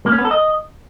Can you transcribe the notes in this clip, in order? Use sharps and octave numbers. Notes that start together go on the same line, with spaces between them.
A#3
C#4
B3
A4
D#5